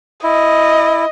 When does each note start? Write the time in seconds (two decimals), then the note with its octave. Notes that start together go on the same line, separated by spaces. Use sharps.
0.24 E4 D#5